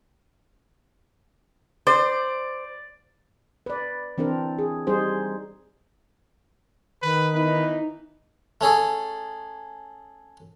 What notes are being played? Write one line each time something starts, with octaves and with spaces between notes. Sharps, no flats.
C5 D5
B4 D5
E3 C4 D4 A#4
G#4
G3 D#4 G#4 C5
D#3 B4
E3 B3 D#4 B4
A3 C#4 G#4 A4